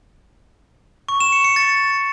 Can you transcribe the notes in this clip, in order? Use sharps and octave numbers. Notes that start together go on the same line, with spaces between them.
C#6
E7
C#7
C#7
A6